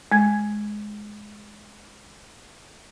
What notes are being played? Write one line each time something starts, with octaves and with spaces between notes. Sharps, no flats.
G#3 G#6